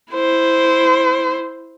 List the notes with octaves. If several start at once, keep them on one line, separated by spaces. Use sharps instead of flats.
E4 C5